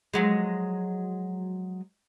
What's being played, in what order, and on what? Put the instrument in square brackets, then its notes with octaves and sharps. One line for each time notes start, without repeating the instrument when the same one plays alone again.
[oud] F3 F#3 G#3